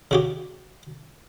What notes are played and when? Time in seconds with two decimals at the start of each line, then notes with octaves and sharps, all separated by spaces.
0.11 C#3 F#4 G4